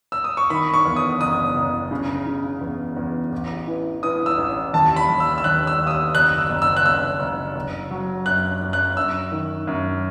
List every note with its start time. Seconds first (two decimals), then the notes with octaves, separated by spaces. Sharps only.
0.12 E6
0.24 D#6
0.37 C#6
0.50 D#3 B5
0.74 C#6
0.85 E2
0.96 D#6
1.21 F#1 D#6
1.56 F#1
1.91 C#3
2.27 C#3
2.61 E2
2.96 E2
3.32 A1
3.67 E3
4.03 E3 D#6
4.26 E6
4.38 A1
4.73 D#2 A5
4.96 B5
5.09 D#2
5.20 E6
5.38 E6
5.44 D#2 F#6
5.67 E6
5.79 D#2
5.87 D#6
5.91 E6
6.15 F#1 F#6
6.38 E6
6.49 F#1
6.62 E6
6.77 F#6
6.85 F#1 E6
7.20 F#1
7.56 F#1
7.91 F#3
8.26 F#2 F#6
8.62 F#2
8.73 F#6
8.97 F#2 E6
9.32 D#3
9.67 F#2